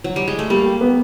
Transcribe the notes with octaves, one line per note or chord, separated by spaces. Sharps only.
F#3
G3
G#3
A3
G3 A#3
G4
B3